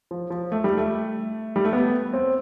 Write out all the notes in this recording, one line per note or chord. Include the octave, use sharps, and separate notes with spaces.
F3
F3
A3
G3
A3
G3
A3
B3
C4